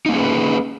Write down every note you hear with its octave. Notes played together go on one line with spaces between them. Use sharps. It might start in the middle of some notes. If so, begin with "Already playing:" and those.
A#3 C#4 D#4 G#4 B4